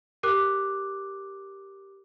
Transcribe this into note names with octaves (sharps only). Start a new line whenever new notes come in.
G4 A#4 D6 F#6